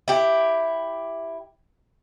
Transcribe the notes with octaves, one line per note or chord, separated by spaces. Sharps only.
E4 G4